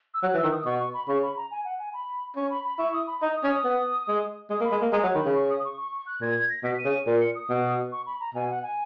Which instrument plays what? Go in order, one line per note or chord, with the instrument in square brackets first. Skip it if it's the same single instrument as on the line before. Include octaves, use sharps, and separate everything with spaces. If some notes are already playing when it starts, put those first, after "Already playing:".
[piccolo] E6
[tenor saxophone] F#3 [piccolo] F#6
[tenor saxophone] E3
[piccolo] E6
[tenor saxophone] D#3
[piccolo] D#6
[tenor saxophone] B2 [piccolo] C#6
[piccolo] C#6
B5
[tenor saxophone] C#3 [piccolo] C#6
[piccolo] B5
A#5
G#5
F#5
G#5
B5
[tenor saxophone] C#4 [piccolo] C#6
[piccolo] B5
B5
[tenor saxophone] E4 [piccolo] C#6
[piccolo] D#6
B5
[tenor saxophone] D#4 [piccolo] A#5
[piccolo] D#6
[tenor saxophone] C#4
[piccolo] D#6
[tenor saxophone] B3
G#3
[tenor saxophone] G#3 [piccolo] D#6
[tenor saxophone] A#3
[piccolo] B5
[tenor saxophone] G#3
A#3
[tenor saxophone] G#3 [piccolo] A#5
[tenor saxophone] F#3
[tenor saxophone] D#3 [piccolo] B5
[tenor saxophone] C#3
[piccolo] C#6
D#6
C#6
C#6
C#6
F#6
[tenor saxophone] A#2 [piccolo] G#6
[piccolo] G#6
A#6
[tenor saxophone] B2 [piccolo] B6
[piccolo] D#7
[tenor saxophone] C#3
[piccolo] D#7
[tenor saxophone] A#2
[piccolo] C#7
D#6
[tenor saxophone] B2
[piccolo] C#6
B5
A#5
[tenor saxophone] B2 [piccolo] G#5
[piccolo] F#5
G#5